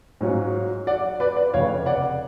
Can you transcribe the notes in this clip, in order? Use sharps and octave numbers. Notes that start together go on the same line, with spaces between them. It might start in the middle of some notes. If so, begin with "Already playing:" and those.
G#2 F#3 C#4 F4
D5 F#5
B4 D5
B4 D5
F1 F2 C#3 C#5 F5
D5 F#5